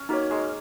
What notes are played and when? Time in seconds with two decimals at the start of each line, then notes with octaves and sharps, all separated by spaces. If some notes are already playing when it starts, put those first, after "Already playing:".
Already playing: C#4
0.09 A#3 D#4 F#4 C#5
0.31 G#3